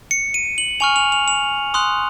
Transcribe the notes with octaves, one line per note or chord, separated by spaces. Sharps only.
C#7
D#7
F#7
G#5 C#6 F6 F7
F7
F7
F7
C6 D#6 F#6